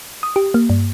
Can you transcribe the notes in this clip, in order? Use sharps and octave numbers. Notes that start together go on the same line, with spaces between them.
D#6
G4
A#3
G2